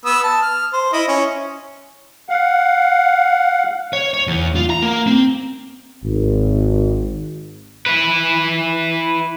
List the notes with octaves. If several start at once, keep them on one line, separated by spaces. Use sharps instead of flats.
B3 D#6 E6
A5
F6
C5
E4 D#5
C#4
F5 F#5
C#5
C#5
E2
F4
A#5
A#3
C4
G#1
E4 B4